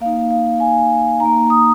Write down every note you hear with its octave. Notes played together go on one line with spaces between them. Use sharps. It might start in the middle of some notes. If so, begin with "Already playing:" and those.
A#3 D#4 F5
F5
G#5
A#3 D#4 A#5
D#6